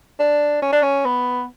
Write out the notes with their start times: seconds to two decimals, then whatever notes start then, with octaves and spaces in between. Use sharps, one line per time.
0.19 D4
0.62 C#4
0.72 D4
0.82 C#4
1.05 B3